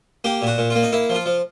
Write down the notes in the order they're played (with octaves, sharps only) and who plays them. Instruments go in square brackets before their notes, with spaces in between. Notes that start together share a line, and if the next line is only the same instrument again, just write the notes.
[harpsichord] A#3 G4
A#2 F#4
A#2
F4
A#3
D#4
A#3 E4
F3
F4
F3